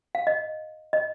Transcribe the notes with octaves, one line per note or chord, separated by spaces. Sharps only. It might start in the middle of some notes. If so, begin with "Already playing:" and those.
F5
D#5
D#5